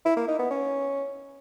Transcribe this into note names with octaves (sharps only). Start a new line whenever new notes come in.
E4
A#3
D#4
B3
C#4